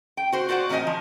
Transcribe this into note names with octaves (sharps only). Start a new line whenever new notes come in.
G5
F#4 C5
F4 F#4 C5 D5 F#5
A#2 F3 D#4 D#5 G#5
F3